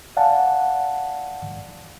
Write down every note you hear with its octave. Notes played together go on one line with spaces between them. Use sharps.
D5 F5 F#5 G#5 A5